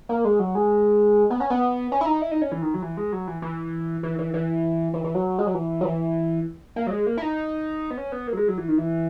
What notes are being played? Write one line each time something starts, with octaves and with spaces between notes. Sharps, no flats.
A#3
G#3
F#3
G#3
B3
C#4
B3
C#4
E4
D#4
E4
D#4
C#4
E3
D#3
F#3
E3
G#3
F#3
E3
E3
E3
E3
E3
E3
E3
F#3
G#3
F#3
E3
F#3
E3
A#3
F#3
G#3
A#3
E4
D#4
B3
C#4
B3
A#3
F#3
G#3
F#3
E3
D#3
E3